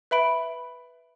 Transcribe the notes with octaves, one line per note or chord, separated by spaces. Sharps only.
B4 E5 B5 D7